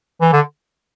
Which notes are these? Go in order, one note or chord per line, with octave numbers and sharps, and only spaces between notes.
E3
D3